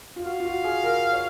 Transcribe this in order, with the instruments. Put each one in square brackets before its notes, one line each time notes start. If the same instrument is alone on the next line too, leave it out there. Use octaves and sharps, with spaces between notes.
[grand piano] F4
[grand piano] F#4 [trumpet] F5
[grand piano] F4
F#4
G#4
A#4
C#5